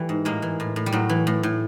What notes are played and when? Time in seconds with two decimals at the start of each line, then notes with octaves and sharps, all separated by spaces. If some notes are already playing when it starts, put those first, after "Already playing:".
Already playing: E3 G3 A3
0.09 G#2
0.25 A2 G#3 A#3
0.42 E3
0.60 A2
0.76 A2
0.86 G3
0.92 A2 F#3
1.09 E3
1.27 A2
1.43 A2